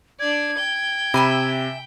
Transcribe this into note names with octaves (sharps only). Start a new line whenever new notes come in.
D4 D5 G#6
G5 G6
C3 E5 G#5 B5